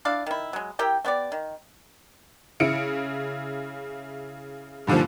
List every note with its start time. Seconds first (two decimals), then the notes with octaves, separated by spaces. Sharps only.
0.05 D4 E4 D5 F5
0.26 D#3 E4
0.53 F#3 G#3
0.79 E4 G4 A#4 G5
1.05 A3 B3 G4 D5
1.32 D#3
2.60 C#3 E4 C#7 D7
4.87 G2 A#2 D3 D#3 F3